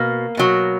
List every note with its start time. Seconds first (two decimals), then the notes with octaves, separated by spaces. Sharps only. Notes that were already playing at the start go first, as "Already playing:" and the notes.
Already playing: B2 A#3
0.37 B2 F#3